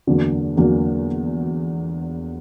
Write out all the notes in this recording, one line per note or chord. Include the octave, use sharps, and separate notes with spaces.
E2 D3 F#3 A#3
E2 D3 F#3 A#3